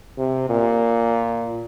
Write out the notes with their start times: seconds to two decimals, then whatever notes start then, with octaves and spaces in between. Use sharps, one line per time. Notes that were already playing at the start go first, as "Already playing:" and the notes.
0.18 C3
0.49 A#2